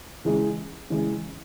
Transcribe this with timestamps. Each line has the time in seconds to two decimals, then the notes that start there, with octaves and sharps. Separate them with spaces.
0.25 C#3 E3 G#3
0.90 C#3 E3 G#3